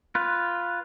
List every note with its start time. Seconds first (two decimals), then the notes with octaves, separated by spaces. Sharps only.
0.15 F4 B4